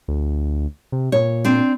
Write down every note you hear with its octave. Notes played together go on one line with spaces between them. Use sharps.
D2
C3
A#2 C#5
C4 D4